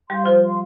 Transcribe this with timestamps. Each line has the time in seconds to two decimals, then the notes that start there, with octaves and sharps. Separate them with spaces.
0.09 G3 G4 F5 C6
0.25 F3 F4 C5
0.42 F5 C6